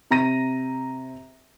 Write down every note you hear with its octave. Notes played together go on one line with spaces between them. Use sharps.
C3 A#5 A#6 D#7